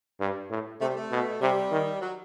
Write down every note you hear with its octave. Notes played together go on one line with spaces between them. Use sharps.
G2
A2
C3 A3
G3
A3
B2
C3 G3
D#3
F#3